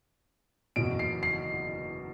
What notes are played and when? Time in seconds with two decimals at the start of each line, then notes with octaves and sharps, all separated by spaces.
0.76 F#1 E2 B2 D7
0.99 C7
1.23 C7